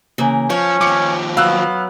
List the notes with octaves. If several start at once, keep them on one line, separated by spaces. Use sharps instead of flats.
C#3 E3 A#3
F3 C#4 C#5
D#2 F3 D6 C#7
F#3 B3 F5 E6 F#6